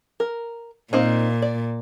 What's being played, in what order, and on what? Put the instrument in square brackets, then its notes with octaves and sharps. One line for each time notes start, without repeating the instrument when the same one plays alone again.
[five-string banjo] A#4
[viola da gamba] A#2 [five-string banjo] A#3 C4 D#4
[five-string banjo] D5